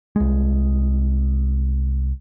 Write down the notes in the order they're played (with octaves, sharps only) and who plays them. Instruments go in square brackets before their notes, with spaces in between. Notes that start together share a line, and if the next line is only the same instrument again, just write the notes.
[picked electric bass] C2 G#3